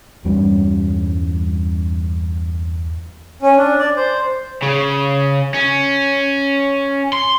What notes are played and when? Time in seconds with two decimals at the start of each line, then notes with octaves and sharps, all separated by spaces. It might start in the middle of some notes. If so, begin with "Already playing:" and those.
0.25 E2 G2 G3 C#4
3.42 C#4
3.57 D4
3.79 D5
3.97 C5
4.63 C#3
5.54 C#4
7.13 C6